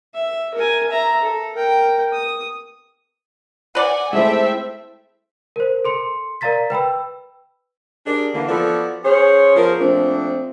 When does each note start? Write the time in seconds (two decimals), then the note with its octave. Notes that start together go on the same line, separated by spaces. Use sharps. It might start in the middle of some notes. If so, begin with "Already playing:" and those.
0.14 E5
0.54 A#4 G#5
0.89 E5 A#5
1.22 A4
1.55 A#4 G5
2.13 D#6
3.75 B4 D5 F#5 G#5
4.13 G#3 A3 C4 E4 A4 E5 G5
5.56 A#4 C5
5.85 A4 C6 C#7
6.41 A#4 D5 F5 A#5 A6 B6
6.70 B4 G5 B5 E6
8.06 D4 G4 G#4 A#4 D5
8.34 D3 E3 A#3
8.49 F3 B3 F#4 A4 D5
9.04 C#4 G#4 C5 C#5
9.56 F3 B3 G#4 A#4 C5
9.79 A#2 F3 A3 C4 D4